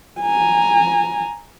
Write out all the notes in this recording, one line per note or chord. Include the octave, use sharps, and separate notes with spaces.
G#5 A#5